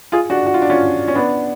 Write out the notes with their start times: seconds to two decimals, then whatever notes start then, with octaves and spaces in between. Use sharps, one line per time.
0.12 F4 G#4
0.30 D4 F#4
0.47 F#4
0.54 F4
0.62 D4
0.70 C#4 F4
1.08 C#4
1.15 B3 D4